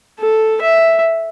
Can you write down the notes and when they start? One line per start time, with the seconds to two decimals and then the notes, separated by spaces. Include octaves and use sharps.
0.19 A4
0.62 E5